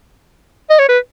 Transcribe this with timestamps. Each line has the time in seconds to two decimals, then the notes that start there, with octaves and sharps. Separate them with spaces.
0.70 D#5
0.79 C#5
0.88 B4